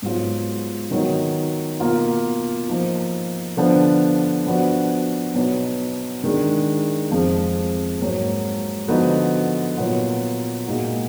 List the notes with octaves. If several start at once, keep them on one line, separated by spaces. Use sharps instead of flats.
G#2 F#3 B3 F4
D#3 F#3 B3 D#4 F#4
B2 A#3 F4
F3 A#3 D#4
D3 F3 B3 D4
F3 B3 D4 F#4
B2 F#3 B3 D#4
D#3 G#3 D4
F2 F3 G#3
G#2 F#3 A#3
D3 F3 B3 D#4 F#4
A#2 F#3 B3 F4
A#2 G#3 D#4 F#4